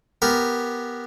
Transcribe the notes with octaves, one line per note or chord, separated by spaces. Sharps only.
B3 G4 A#4